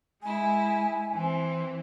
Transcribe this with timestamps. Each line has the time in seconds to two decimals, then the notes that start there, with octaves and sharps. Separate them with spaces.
0.23 G#3 E4 G#5
1.13 E3 C4